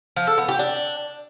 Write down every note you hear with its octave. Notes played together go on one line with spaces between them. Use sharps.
F3
A4
B3
G4
D4